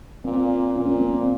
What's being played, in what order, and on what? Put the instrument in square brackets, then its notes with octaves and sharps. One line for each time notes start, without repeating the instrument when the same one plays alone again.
[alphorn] A#2 [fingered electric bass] C4
[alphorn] A#2 [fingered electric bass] C#4
[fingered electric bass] C4
A#3
C4